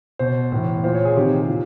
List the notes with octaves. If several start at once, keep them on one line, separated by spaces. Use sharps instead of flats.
B2 C5
A2 E3
A#2 C5
C#5
G#4
C3 D#3 G4
A#2